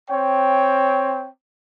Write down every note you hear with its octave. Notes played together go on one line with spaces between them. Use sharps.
C4 C#5 G5